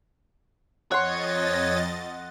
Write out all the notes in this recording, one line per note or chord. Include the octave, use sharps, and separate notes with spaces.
F2 C#5 D#5 F#5 C6 A6